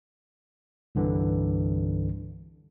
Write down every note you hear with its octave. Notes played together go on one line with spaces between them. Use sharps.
C2 G2 D3 E3